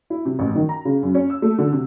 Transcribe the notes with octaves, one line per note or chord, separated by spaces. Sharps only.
E4
C3
A1
D#3
A#5
C#3
F#2
C#4
E6
A3
D3
C3